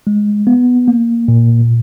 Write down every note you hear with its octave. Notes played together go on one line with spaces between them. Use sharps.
G#3
B3
A#3
A#2